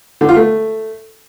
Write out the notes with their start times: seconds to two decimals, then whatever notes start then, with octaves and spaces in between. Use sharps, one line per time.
0.21 D3
0.29 F4
0.36 A3